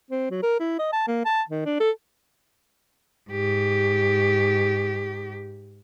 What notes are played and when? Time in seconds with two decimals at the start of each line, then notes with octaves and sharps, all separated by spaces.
0.11 C4
0.31 F#3
0.43 A#4
0.60 E4
0.79 D#5
0.93 A5
1.08 A#3
1.25 A5
1.49 D#3
1.66 D4
1.80 A4
3.30 G#2 G4